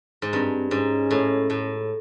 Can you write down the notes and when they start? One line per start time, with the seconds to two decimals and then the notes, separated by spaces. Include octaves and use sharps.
0.22 G#2
0.33 G2 C4
0.71 G#2 C#4
1.11 A2
1.50 A2